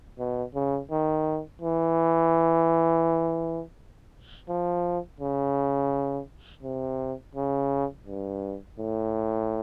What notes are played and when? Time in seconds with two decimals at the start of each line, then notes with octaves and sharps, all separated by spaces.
0.19 B2
0.55 C#3
0.91 D#3
1.62 E3
4.49 F3
5.21 C#3
6.63 C3
7.35 C#3
8.07 G2
8.79 A2